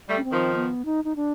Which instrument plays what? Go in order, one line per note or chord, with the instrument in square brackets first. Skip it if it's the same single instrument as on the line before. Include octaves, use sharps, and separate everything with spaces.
[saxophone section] G3 A3
[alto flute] C#4
C4
[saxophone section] D#3 F3
[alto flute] B3
D#4
D#4
D4